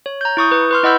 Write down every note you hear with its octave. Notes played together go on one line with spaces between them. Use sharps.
C#5
A#5 G6
E4 C#6 D#6 G6
B4 C#6
B4 C6 F6
E4 D#5 F#5 B5 E6 G6